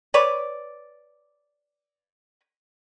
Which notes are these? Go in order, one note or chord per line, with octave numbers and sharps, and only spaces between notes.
B4 C#5 D5